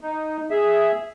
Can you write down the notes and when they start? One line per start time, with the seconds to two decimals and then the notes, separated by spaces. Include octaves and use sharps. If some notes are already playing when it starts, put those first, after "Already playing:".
0.01 D#4
0.50 G#4 E5